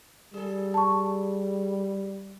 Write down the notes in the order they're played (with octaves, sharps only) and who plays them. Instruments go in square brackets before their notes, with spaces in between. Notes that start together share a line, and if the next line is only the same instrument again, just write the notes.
[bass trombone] G3 [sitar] G#4 A4
[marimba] A5 C#6